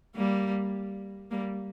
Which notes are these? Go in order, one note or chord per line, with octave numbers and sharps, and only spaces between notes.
G3 A#3
G3 A#3